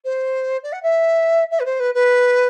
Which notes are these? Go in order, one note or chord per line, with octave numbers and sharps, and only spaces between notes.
C5
D5
F#5
E5
E5
B4
C5
B4
B4